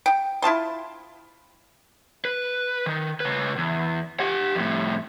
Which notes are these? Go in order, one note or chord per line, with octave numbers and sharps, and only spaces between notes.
G5
E4 F4 A5 C6
B4
D#3
C#3 B4
E2
G4 F#5
F2 A2